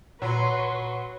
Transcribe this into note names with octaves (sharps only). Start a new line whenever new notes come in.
A#2 F#3 B4 C6 C#6